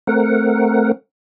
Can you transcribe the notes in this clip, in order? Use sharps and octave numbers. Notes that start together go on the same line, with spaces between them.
A3 C4 A#4 F#5